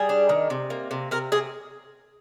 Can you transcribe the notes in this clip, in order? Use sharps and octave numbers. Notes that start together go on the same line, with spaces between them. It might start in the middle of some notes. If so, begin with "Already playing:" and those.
Already playing: G3 G#4
D4
D#3
C3
A#3
C3
C3 A#4
C3 G#4